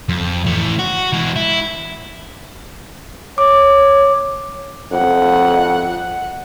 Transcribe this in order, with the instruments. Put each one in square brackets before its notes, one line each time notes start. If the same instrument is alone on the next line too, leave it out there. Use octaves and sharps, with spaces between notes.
[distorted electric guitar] F2
E3 A3
F#4
E3 G#3
E4
[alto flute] C#5 [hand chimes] D6
[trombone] F2 [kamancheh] F#5